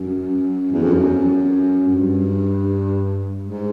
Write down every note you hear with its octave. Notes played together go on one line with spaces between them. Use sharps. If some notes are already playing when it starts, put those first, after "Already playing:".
Already playing: F#2
E2
F2
F#2
F#2
G2
G#2